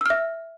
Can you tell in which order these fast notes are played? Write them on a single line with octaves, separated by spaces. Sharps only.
E6 F6 E5